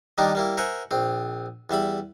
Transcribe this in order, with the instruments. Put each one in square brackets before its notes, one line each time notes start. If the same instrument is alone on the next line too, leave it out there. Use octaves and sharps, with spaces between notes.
[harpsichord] D#3 G3 A#3 D4 D#4
G3 A#3 E4
A#4 C5 E5 F#5 G#5
A#1 C4
E2 G3 E5 B5